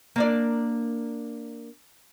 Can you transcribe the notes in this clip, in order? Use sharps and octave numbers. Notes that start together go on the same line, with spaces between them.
A#3 D4 D5